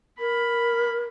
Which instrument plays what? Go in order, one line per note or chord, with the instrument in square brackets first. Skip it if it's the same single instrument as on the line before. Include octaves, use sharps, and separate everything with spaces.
[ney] A#4 [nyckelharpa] B5